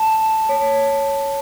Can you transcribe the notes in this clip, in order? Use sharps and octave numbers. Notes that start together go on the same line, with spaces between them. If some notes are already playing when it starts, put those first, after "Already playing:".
Already playing: A5
C#5